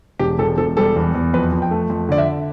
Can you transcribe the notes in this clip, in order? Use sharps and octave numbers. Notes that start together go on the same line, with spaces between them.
E1 G4
E1 A4
E1 A4
G3 A4
E2
E2
F2 B4
F2
G5
A3
F2
D3 D5
E5